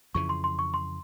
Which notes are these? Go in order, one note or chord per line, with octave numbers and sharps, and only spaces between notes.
F2 C#3 E3 C#6
C6
C6
C#6
C6